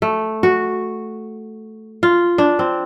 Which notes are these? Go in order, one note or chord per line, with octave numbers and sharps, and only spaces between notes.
A3
F#4
F4
D4
C4